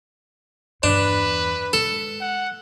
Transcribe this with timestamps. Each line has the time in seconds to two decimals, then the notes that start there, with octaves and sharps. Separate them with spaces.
0.83 E2 G2 D4 B4
1.73 G#3 A4
2.21 F#5